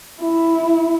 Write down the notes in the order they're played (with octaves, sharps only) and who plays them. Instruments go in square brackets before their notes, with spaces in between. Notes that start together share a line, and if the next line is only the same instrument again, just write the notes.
[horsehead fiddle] E4